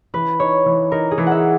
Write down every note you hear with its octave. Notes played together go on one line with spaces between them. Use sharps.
E3 B4
D#4 C#5
E3
D#4 A#4
G#4
E3
E5 F#5